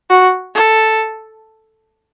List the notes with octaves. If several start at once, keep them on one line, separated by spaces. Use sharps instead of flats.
F#4
A4